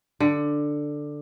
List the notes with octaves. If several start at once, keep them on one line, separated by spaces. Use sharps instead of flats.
D3